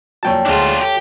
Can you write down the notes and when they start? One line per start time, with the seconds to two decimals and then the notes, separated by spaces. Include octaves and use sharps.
0.23 F2 A#2 F#3 C#5 G5 A5
0.46 D2 G#3 C4 D4 F4
0.81 A3 G4